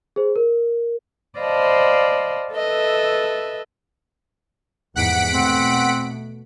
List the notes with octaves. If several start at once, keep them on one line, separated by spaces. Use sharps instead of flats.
G#4 C5
A#4
C5 D5 D#5 F5 A5 B5
A4 B4 D#5 E5
F1 E2 G#2 F#5 B6 D7
B2 A3 C4